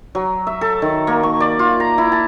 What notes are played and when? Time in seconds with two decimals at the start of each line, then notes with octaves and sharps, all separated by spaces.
0.15 F#3
0.47 E5
0.61 A4
0.82 D#3
1.07 A#3
1.23 C#6
1.40 D5
1.59 F4
1.80 A#5
1.98 E4
2.12 A5